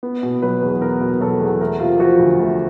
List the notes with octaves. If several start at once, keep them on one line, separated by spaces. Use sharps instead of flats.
B3
B2
F#3 B4
E2
B3 A#4
B2
F#3 A4
E2
A3 A#4
C3 F4
F3 F#4
D2
A3